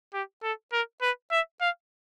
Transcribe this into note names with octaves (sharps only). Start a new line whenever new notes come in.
G4
A4
A#4
B4
E5
F5